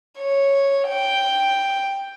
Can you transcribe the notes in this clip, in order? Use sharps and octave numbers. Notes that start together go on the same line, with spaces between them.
C#5
G5